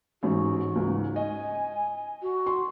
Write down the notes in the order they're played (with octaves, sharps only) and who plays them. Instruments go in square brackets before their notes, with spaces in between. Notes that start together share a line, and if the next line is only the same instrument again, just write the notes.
[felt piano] A1 G#2 [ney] F#4
[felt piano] C#2 G#2
[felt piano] D#5 [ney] G#5
[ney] F#4
[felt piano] C6